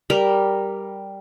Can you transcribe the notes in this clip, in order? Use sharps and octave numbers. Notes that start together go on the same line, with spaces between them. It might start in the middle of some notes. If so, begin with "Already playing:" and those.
G3 A#4